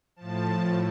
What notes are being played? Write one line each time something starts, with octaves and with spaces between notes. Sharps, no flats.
A2 F3 A5